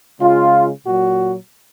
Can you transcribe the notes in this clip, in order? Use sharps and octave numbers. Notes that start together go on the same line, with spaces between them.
C#3 G#3 F4
A#2 F#3 F#4